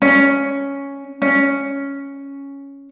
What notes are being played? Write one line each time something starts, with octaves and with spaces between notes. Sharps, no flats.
C#4
C#4